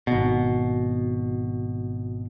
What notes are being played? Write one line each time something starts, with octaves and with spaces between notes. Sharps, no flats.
G#1 B2